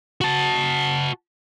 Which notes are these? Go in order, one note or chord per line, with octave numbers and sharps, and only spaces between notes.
F#4 A5